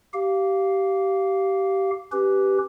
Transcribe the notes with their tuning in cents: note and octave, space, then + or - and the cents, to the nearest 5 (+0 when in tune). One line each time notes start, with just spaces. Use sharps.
G4 -20 F5 +0
C#4 +0 G4 -10 B4 +0